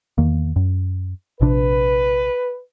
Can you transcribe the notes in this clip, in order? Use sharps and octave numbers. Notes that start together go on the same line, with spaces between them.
E2 D#3 A#3
F#2
A#1 C3 D4 B4